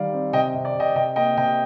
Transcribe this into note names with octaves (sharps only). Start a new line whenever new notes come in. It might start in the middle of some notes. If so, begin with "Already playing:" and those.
Already playing: D#3 G3 D5 F5
C4
C3 D#5 G5
C3
D5
C3 D#5 G5
C3 D#5 G5
A#3 D#5 G5
C3 D#5 G5